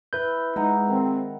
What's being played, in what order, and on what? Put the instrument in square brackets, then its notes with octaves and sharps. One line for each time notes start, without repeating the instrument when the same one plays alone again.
[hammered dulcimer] E4 [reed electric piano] B4 G6
[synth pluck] G#3 [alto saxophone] D#4 [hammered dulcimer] F#5 A#5
[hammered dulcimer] D#3 [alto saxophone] C4